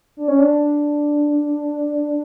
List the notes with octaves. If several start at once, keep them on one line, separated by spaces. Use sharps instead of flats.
D4
C#4
D4